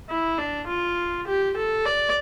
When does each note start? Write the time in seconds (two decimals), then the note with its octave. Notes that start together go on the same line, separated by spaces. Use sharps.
0.09 E4
0.38 D4
0.67 F4
1.27 G4
1.56 A4
1.86 D5